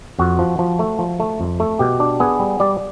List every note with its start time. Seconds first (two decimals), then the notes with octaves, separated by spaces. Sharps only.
0.19 F2 F#4
0.39 F3
0.59 F3
0.79 A3
0.99 F3
1.20 A3
1.40 F2
1.60 A3
1.79 B2 G4
2.00 D4
2.20 B3 G#4
2.40 G3
2.60 G3 D5